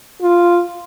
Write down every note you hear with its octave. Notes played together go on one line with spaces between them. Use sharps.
F4